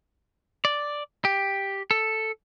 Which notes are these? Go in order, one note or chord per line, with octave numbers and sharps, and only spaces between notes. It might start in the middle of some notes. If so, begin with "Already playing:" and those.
D5
G4
A4